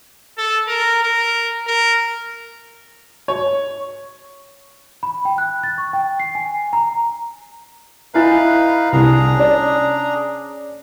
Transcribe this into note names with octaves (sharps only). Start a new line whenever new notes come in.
A4
A#4
A#4
A#4
C#5
B5
G5
F#6
A6
C#6
G5
C7
G#5
A#5
D#4 E4 B4 F5 G#5 A6
C2 D4 G#4 A#5
C#4 D5